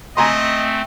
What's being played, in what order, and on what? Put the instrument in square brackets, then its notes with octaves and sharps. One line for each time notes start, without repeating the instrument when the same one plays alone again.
[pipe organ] A3 C4 [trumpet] D#5 [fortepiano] G#5 A#5 C6